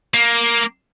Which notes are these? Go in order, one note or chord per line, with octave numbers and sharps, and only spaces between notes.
A#3